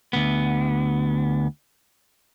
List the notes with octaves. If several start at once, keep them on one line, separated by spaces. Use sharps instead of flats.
D2 B3